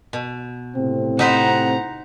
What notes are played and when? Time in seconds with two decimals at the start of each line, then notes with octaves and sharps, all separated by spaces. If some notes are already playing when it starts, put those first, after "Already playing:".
0.13 B2
0.75 A2 C3 C4
1.19 D#4 B4 C5 F#5 A#5